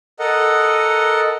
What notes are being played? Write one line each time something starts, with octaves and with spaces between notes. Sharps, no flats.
A4 A#4 D#5 F#5